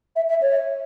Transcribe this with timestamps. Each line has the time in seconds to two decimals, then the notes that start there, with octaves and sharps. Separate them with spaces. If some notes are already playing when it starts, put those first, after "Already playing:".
0.16 E5
0.29 E5
0.42 C#5